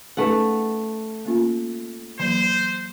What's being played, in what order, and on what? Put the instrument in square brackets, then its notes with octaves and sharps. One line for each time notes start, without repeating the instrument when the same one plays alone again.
[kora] A3 F#5 [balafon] C#4 D#4 B4
[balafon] A#3 C#4 F4
[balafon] E3 F#3 A#3 [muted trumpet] C5